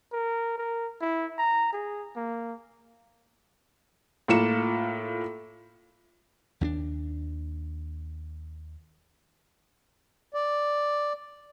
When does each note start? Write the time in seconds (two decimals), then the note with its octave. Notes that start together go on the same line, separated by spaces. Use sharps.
0.13 A#4
0.58 A#4
1.01 E4
1.38 A#5
1.73 G#4
2.16 A#3
4.28 A2 A#3 F4 C#7 E7
6.61 D#2 C#4 D4
10.34 D5